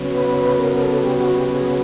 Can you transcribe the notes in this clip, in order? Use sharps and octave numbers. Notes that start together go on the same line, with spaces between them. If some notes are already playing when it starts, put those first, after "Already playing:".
Already playing: C#3 F#3 B3
B4
B4
A#4
A#4
A4
G4
F#4
G4
G#4